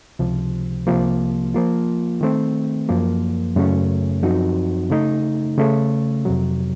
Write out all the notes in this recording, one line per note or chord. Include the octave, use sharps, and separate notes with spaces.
C#2 C3 F3
C2 C3 F3 A#3
F3 A#3 F4
D#3 A3 C4
F#2 F3 A#3
F#2 C#3 A3 C#4
F#2 F3 C4 D#4 F#4
C#3 A3 D#4
C#3 A3 C#4
F2 C3 F#3